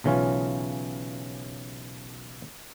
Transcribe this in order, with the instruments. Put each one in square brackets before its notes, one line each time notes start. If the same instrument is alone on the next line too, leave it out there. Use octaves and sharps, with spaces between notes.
[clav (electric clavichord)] B1 C#3 E3 C#4 F4